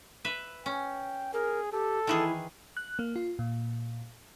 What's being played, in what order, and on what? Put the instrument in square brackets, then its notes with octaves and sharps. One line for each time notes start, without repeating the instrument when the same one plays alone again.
[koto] B4 E5
[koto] C#4 [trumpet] G5
[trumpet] G#4 [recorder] A#4
[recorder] G4 [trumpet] A4
[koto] D#3 E3 G#4 [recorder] E4
[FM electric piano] F#6
A#3
F4
A#2